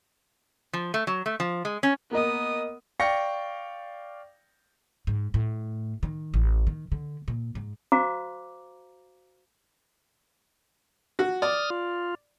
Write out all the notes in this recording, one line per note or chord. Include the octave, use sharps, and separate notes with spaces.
F3
A3
F#3
A3
F3
G#3
C#4
A#3 B3 A#4 D#5 D#6
D5 F5 G5 C#6 A#6 C#7
G#2
A2
D#3
A1
D#3
D3
A#2
G#2
F#4 C5 F5 A#5 D6
F#4
D5 D#6 F6
F4